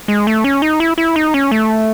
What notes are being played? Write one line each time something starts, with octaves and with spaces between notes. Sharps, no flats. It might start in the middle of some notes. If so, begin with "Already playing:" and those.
G#3
A3
C#4
D#4
E4
E4
D#4
C#4
A3